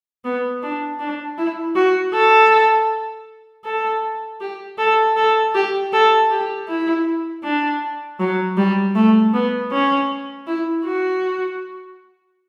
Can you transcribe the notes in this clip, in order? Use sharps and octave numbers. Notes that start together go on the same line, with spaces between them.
B3
D4
D4
E4
F#4
A4
A4
G4
A4
A4
G4
A4
G4
E4
D4
F#3
G3
A3
B3
C#4
E4
F#4